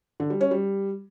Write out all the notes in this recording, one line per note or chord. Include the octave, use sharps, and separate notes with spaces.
D3
G3
C#4
G3